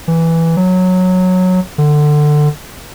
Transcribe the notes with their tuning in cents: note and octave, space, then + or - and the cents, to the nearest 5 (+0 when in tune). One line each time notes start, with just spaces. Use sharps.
E3 +0
F#3 -10
D3 +20